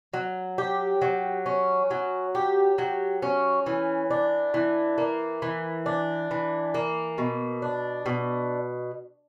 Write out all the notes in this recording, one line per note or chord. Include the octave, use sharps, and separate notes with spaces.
F#3
G4
F#3
C#4
F#3
G4
F#3
C#4
E3
D4
E3
A#3
E3
D4
E3
A#3
B2
D4
B2